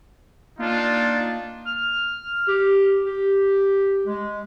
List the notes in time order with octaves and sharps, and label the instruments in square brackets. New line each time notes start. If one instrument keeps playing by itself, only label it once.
[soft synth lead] A#3 [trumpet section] D4 D#4 F4
[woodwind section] F6
G4
G4
G#3